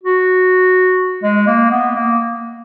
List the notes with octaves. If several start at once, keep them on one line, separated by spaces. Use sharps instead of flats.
F#4
G#3
A#3
B3
A#3